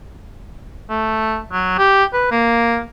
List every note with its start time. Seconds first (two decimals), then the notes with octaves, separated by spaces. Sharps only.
0.90 A3
1.52 F#3
1.78 G4
2.13 B4
2.31 A#3